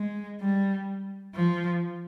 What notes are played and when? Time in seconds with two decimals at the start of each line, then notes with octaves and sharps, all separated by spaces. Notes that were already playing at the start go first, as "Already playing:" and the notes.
Already playing: G#3
0.41 G3
1.35 F3